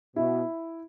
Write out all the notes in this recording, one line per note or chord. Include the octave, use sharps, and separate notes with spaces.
B2 E4